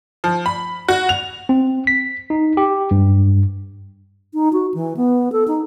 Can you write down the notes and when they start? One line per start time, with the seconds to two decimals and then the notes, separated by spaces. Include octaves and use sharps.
0.24 F3
0.46 B5
0.88 F#4
1.09 F7
1.49 C4
1.87 B6
2.30 D#4
2.57 G4
2.91 G2
4.34 D#4
4.53 F#4
4.74 E3
4.97 B3
5.32 A4
5.48 D#4